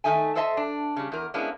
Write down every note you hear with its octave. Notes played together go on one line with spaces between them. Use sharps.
D#3 A3 D#4 E5 G#5
D4 A4 C5 D#5 E5 A5
D4
C#3 G3
E2 A#4
G#3 A#3 B3 C#4 D4 E4